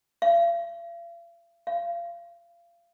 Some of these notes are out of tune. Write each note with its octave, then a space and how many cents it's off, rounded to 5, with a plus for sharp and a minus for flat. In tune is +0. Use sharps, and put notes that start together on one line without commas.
F5 -45
F5 -30